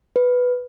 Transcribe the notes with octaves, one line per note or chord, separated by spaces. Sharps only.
B4